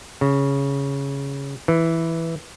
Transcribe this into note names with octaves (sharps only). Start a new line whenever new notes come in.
C#3
E3